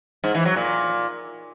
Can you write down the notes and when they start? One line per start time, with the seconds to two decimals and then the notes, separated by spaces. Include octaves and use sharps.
0.24 G#2
0.35 E3
0.45 F#3
0.56 A#2